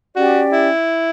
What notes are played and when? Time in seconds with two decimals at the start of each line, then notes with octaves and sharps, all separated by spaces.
0.16 C#4 F#4 G4 D5 G5
0.52 E4